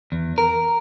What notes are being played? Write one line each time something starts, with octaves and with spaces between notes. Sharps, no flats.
E2
A#4